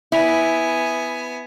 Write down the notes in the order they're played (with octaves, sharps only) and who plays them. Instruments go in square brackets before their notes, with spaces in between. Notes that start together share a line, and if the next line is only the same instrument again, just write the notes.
[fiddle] B3 G#5 [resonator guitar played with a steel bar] E4